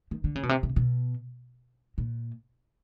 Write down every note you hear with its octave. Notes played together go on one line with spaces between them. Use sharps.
D#3
D3
C#3
B2
C3
C3
B2
A#2